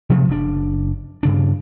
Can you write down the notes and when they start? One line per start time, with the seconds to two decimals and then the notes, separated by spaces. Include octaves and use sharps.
0.10 C3 F3 F#3 A3
0.28 F#1 F#2 D4
1.23 G2 C#3 D4